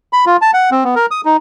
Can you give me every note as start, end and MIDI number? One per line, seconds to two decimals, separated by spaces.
0.13 0.25 83
0.26 0.37 65
0.42 0.51 81
0.54 0.70 78
0.71 0.84 60
0.84 0.95 59
0.96 1.06 70
1.11 1.21 87
1.25 1.37 63